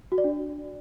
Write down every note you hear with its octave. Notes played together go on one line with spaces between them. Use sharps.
F#4
D5
D4